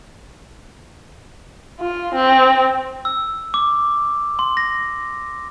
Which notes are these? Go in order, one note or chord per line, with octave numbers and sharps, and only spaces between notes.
F4
C4
E6
D6
C6
A#6